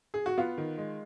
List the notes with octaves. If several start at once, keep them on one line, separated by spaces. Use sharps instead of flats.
G#4
F#4
B3 F4
D#3
G#3